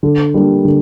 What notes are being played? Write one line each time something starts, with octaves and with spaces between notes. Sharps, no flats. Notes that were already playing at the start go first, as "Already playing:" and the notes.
D3
G3 A#3 D4 G4
D3